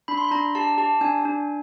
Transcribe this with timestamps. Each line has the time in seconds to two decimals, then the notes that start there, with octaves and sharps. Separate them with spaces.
0.08 D4 B5
0.17 C6
0.25 B5
0.31 D4 A#5
0.55 G4 A5
0.78 G4 A5
1.01 D4 G#5
1.25 D4